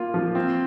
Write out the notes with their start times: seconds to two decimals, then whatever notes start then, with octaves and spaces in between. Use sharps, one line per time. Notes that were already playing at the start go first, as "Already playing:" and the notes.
Already playing: A#3 F4
0.14 F3
0.35 C4